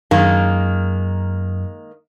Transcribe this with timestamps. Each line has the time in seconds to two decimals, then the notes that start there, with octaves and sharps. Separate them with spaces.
0.11 F#2 D#3 F#3 G#3 A#3